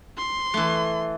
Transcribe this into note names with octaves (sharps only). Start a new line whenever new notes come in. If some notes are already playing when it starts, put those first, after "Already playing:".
C6
E3 A3